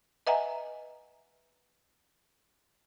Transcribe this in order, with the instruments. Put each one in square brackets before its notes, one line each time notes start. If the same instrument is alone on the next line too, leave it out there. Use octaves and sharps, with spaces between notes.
[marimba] B4 D#5 E5 F#5 G#5 A#5